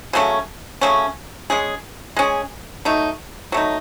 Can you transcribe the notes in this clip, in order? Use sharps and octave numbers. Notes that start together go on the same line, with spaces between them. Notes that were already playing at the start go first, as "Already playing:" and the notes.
C#3 F#3 A3 C#4
C#3 F#3 A3 C#4
G#3 C#4 G#4
G#3 C#4 G#4
F#3 A3 D#4
F#3 A3 D#4